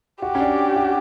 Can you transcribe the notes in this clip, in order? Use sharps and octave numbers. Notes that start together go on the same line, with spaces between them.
F#4 G4
C#4
D4
F#4